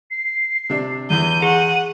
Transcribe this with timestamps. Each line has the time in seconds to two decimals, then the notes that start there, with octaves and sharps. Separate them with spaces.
0.11 C7
0.70 C3 D4
1.10 E2 E3 G6 D#7
1.42 G#4 F#5